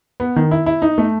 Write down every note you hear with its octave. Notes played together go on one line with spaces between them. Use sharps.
B3
D#3
E4
E4
D#4
A3